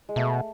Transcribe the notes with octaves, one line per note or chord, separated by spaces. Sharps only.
G#3
B2 A3